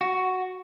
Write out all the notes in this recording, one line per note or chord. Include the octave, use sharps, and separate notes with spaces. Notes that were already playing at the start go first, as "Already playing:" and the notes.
F#4